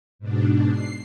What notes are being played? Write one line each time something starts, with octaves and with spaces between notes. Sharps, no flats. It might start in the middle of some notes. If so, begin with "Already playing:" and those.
G#2 B2 D4
C7